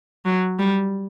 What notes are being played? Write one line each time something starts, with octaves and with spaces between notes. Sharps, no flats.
F#3
G3